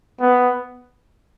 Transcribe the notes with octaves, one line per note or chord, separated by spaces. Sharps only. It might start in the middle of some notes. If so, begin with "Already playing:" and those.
B3